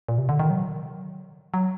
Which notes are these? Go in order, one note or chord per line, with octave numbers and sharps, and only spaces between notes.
A#2
C3
D3
D#3
F#3
F#3